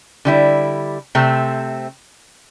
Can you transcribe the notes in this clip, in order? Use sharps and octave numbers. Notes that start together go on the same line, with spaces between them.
D3 G3 E4
C3 A3 C4